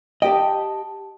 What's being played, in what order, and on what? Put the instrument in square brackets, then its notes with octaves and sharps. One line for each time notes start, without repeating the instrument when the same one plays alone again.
[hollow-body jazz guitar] G4 D#5 [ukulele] G5 A5